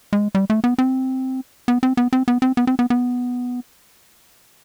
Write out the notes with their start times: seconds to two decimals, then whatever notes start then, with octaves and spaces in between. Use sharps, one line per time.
0.13 G#3
0.35 G3
0.50 A3
0.64 B3
0.78 C4
1.68 B3
1.83 C4
1.97 B3
2.13 C4
2.28 B3
2.42 C4
2.57 B3
2.67 C4
2.79 B3
2.90 B3